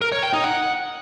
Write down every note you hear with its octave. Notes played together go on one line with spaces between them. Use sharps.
A#4
C#5
G5
D#4
F#5